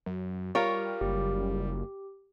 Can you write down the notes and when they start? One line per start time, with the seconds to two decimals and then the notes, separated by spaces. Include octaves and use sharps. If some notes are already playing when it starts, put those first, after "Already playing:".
0.06 F#2
0.55 G3 F4 A#4 C#5
1.01 F#1 G4